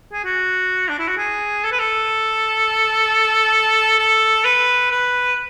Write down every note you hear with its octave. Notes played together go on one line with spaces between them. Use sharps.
G#4
F#4
D4
E4
F#4
G#4
A4
B4
A4
A4
B4
B4